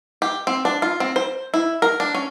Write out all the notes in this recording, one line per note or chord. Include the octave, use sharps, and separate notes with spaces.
G4
C4
D4
F4
C4
C5
E4
A#4
D4
C#4